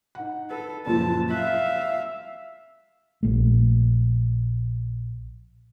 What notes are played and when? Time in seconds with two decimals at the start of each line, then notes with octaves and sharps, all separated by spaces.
0.15 D#4 F#5
0.50 A4 B4
0.86 F#1 A#2 F3 A5
1.30 E5 F5 F#6
3.23 A#1 A3